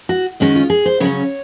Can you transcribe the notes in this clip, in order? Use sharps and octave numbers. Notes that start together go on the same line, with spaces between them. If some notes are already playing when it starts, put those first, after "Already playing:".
F#4
D#3 G#3 C#4 F#4
F4
G#4
C5
C#3 F#3 C#4 C#5